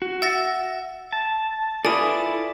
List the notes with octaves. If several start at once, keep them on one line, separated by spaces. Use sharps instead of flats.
F#4
E5 F#5 A6 A#6
A5
E4 F4 A4 B4 D5 G#5 D#6